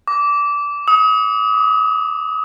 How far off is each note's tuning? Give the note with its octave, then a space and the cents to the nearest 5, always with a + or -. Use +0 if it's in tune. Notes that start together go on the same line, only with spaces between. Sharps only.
D6 -20
D#6 +35
D6 +25